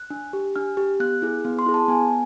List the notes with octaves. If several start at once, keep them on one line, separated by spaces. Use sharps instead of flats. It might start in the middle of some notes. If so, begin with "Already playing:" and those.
Already playing: F#6
D4
G4
D4 F6
G4
B3 F#6
E4 G#4
B3
C6
E4 G#4
A5
B3 G#5